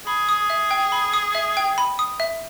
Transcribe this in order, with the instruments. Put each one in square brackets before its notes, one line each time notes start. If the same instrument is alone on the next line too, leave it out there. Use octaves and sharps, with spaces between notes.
[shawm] G#4 [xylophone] B5
[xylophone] D#6
E5
G5
B5
D#6
E5
G5
B5
D#6
E5